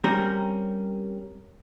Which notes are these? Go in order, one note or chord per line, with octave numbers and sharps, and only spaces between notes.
G3 C4 C#4 A#4